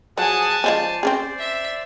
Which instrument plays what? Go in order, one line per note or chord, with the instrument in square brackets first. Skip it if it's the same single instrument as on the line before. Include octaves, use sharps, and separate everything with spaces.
[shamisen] F3 F#3 [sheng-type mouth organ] G#4 F#5 D#6 [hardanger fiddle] G#5 A5
[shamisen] F3 G#3 C#4 [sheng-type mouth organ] C5 D5
[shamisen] C4 C#4 G#4
[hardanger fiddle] E5